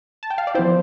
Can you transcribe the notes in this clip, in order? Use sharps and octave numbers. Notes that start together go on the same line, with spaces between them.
A5
G5
F5
D5
F3 B3 E4 C5